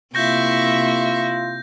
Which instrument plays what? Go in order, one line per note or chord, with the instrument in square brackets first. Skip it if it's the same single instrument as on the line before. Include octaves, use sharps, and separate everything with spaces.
[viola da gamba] C3 A#3 E4 [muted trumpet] F4 [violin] E5 C#6 [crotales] G6 A#6